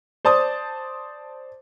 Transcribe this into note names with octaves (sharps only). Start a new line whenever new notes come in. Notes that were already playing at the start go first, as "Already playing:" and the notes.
C5 D5 A5 D#6